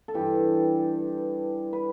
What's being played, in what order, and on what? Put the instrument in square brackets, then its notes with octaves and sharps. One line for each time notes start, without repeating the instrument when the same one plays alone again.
[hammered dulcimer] A4
G2 E3 G4
B4